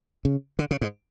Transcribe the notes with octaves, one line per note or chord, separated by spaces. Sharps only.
C#3
D3
C#3
G#2